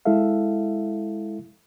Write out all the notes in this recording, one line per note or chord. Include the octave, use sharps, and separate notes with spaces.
G#3 E4 A4 E5 F5